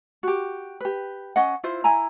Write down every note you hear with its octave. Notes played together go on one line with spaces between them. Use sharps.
F#4 G4
G4 B4
C#4 D#5 F#5
E4 F4 C5
E4 G#5 A#5